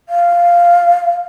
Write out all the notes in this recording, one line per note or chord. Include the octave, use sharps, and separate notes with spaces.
F5